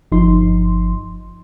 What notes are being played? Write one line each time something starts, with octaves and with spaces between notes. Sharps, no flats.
G1 F3 D#4 C6